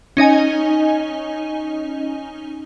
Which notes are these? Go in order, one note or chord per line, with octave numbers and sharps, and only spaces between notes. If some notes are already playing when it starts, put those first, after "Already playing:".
C#4 D#4 D#5 G#5